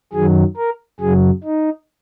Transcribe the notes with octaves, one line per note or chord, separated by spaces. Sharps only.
F#2 D#3 F#3 G#4
A#4
F#2 C#3 F#3 G#4
D#4